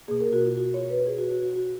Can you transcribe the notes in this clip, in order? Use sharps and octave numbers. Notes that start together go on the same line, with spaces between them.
B2 A#3 G#4
A#4
F#4
F4
F#4
C#5
B4
G#4
F#4
F#4
F#4
F#4